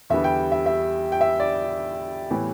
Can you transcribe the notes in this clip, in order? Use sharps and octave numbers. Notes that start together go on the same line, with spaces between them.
E2 D3 G3 B3 E5
G5
E5
E5
G5
E5
D5
A2 E3 G3 B3